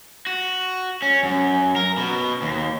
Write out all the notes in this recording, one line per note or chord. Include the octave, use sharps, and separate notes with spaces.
F#4
C#4
F#2
A#4
B2
D#2